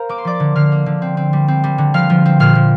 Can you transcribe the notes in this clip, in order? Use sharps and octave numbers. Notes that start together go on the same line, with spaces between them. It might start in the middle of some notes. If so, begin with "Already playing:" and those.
Already playing: A#4 C5 F5 A#5
A#3 D6
C6
F3 D5 D6
D3
D3 F5 F6
A#3
D3
C4
C4
G3
C4
G3
D3
F3 F5 F6
F3
C4
A#2 F5 F6
F3